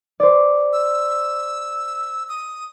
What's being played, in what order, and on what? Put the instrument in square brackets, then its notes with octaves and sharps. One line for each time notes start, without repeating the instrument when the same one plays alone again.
[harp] C5 D5
[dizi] E6
D#6